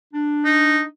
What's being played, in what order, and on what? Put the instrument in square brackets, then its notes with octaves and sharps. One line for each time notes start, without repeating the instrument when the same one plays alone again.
[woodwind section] D4
[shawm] D#4